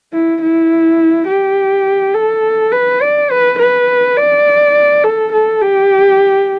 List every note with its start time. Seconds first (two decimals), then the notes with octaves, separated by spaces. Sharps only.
0.13 E4
0.42 E4
1.28 G4
2.15 A4
2.72 B4
3.01 D5
3.31 B4
3.59 B4
4.17 D5
5.04 A4
5.33 A4
5.62 G4